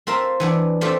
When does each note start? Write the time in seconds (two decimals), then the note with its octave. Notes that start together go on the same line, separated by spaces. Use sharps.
0.07 C4 F4 A#4 E5 F5 A5
0.40 E3 B3 D4
0.81 A3 C4 F4 G4 D5 E5